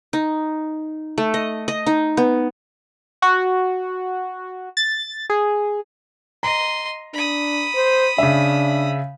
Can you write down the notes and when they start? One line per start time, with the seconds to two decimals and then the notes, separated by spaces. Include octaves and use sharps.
0.13 D#4
1.18 A3
1.34 D#5
1.68 D#5
1.86 D#4
2.17 B3
3.22 F#4
4.77 A6
5.30 G#4
6.43 D#5 A#5 C6
7.14 D4 B5 D#6
7.75 C5
8.18 C#3 D4 E5